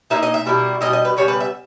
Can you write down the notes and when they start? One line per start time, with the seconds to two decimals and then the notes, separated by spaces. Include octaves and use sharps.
0.10 A#2 A#3 D#4 E5
0.22 D#5
0.34 E5
0.46 B2 G3 A#3 E4
0.81 B2 G3 A#3 E4 D#5
0.93 D#5
1.05 B4
1.17 C#3 G3 B3 C#5
1.28 B4
1.40 E5